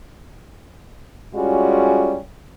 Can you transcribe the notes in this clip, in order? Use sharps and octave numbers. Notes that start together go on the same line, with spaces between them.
G3 G#3 C#4 F4 F#4